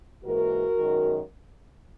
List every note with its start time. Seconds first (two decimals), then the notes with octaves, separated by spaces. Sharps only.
0.23 G#2 E3 A#3 F#4 A#4
0.76 F#2 D#3 G#3